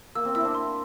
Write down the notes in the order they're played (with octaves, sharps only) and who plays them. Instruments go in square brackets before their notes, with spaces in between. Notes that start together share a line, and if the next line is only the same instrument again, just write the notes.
[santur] A#3 [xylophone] E6
[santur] C4
[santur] E4 [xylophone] E6
[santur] C4 D4
[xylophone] C6